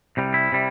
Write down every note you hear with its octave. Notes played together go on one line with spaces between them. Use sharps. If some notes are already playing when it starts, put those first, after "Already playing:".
C2 C3 G3
E4
C3 G3